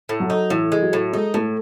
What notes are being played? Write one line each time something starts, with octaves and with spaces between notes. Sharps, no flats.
A2
F#3 F#4
D#4
A2 E3 E4
G#3
G#4
F#3 F#4
A2
G#3 D#4 G#4
A2 A3 A4